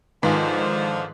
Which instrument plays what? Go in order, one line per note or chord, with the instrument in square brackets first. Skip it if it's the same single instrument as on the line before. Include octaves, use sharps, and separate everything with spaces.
[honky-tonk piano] G#2 [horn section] D3 F3 [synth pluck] D#3 [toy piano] B4 F5 G#5